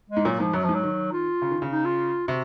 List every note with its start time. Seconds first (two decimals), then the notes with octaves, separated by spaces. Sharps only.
0.10 G#3
0.16 G#2
0.25 A#2 F#3
0.39 G#2 F3
0.53 F#2 F#3
0.64 G#2 F3
0.74 F#3
0.83 D#3
1.12 F4
1.42 C#3
1.51 D#3
1.62 C#3
1.70 D#4
1.85 F4
2.28 C3 F#4